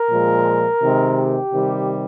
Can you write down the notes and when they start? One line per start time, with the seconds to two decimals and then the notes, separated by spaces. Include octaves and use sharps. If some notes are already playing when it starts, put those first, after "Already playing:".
Already playing: A#4
0.11 A#2 F3 G#3
0.82 C3 D#3 G#3
1.18 G4
1.54 C3 D#3 G3